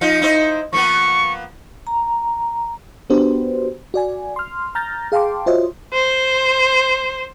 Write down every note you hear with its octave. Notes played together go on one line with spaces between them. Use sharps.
F3 D#4 F4 C#7
D#4 E4 C5
F3 A#3 B3 C#6
A#5
B3 D4 F#4 G4 B4 C5
F#4 D5 G#5
C6 F6
A#5 F6 G6 A6 A#6
G#4 F5 G5 A5 C6 D6
F4 F#4 C5 C#5 D#5 E5
C5